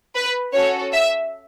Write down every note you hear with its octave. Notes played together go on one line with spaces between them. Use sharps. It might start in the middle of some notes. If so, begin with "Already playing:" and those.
B4
C#4 F#4 A4 C#5
E5